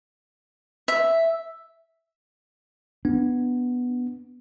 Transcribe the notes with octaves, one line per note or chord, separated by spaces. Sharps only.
E5
B3 D4